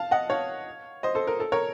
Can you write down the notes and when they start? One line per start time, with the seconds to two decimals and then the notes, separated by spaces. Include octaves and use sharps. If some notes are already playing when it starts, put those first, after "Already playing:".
Already playing: F5 A5
0.11 D#5 F#5
0.30 C#5 F5
1.03 C5 D#5
1.15 A4 C5
1.27 A#4
1.40 A4
1.52 A#4 C#5